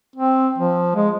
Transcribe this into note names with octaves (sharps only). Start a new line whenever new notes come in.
C4
F3
G#3